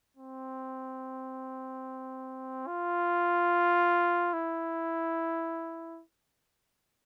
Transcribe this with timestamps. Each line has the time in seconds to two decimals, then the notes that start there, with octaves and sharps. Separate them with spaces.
0.17 C4
2.67 F4
4.33 E4